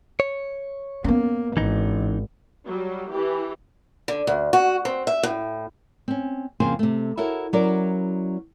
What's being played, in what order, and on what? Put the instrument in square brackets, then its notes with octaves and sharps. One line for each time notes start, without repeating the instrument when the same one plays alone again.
[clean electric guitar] C#5
[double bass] A#3 [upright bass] B3 C#4
[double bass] G#1 [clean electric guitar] E3 D#4
[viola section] F#3 G3
E3 G4
[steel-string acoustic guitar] D3
D2
F#4
C4
E5
A2
[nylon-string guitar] C4 C#4
F2 C#3 A#3 G#4 C5
C3 A3
E4 F#4 A4 A#4 C#5 E5
F#3 C#4 E4 A#4 D5